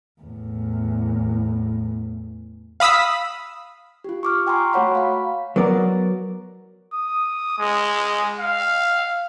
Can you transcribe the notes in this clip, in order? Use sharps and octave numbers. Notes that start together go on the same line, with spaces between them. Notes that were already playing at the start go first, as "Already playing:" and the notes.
E2 A2
F5 B5 D#6 E6 B6
F4 G4
C#6 D6 F6
G5 G#5 A#5 C6 C#6
A3 F#4 C#5 F#5 B5
F5 B5
F#3 B3 A#4 D5
D#6
G#3
F5